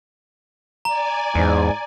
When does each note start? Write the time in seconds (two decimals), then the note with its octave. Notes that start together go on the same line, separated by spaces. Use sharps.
0.85 D5 G#5 A#5
1.35 E2 G#2